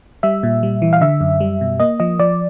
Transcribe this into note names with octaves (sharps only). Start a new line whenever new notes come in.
G3 E5
A#2
G3
E3
F5
D3 E5
F#2
G3
B2
A#3 D#5
F3 D#5
F3 D5